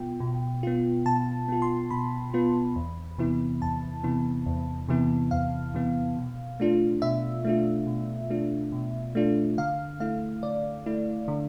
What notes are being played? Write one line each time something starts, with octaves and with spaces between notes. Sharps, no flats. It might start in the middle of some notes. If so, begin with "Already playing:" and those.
Already playing: B2 B3 F4 G5
B2
B3 F4
B2 A5
B3 F4
C6
B2 B5
B3 F4
E2
C3 E3 B3 E4
E2 A5
C3 E3 B3 E4
E2
C3 E3 B3 E4
E2 F5
C3 E3 B3 E4
B2
A3 D4 F4
B2 E5
A3 D4 F4
B2
A3 D4 F4
B2
A3 D4 F4
D3 F5
A3 E4 F5
D3 D5
A3 E4
D3